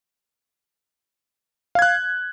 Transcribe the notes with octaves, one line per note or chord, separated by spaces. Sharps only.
F5 F#6 G#6